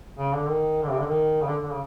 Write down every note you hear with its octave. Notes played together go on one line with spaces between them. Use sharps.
C#3
D3
D#3
D3
C3
D3
D#3
C#3
D3
D3
C#3